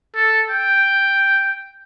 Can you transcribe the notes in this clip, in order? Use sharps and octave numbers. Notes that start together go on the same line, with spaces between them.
A4
G5